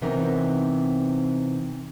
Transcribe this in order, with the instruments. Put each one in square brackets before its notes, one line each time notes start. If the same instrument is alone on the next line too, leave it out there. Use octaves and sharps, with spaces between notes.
[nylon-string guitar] C3 E3 B3 C4 D#4 A#4